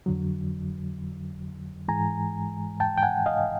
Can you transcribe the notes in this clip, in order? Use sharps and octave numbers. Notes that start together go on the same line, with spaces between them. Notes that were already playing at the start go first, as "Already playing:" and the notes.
F2 D3 F#3
G#2 E3 G#3 G#5 A#5
G5 A5
G5
F#5 G#5
D#5 F5